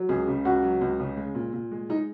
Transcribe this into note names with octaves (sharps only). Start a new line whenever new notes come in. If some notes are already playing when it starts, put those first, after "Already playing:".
Already playing: F#3
C#2 G#4
C#3
C#2 F#4
F#3
C#2
C#3
G#3
A#2
A#2
G#3
G#3 D#4